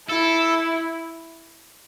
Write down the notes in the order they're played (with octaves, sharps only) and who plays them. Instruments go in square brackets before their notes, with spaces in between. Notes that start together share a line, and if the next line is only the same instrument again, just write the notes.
[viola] E4 [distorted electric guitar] A4